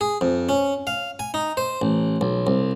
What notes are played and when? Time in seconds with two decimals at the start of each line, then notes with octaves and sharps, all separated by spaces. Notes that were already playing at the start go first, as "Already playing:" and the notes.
0.01 G#4
0.21 F2
0.49 C#4
0.87 F5
1.19 G#5
1.34 D#4
1.57 C5
1.82 A1
2.21 B1
2.47 C2